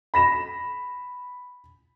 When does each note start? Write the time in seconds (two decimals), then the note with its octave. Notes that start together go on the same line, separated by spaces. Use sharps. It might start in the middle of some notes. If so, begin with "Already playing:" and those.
0.14 B5 A#6 E7